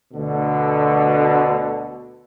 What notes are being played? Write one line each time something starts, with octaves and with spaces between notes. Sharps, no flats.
D2 B2 D3